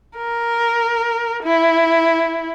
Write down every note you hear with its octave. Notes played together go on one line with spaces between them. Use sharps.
A#4
E4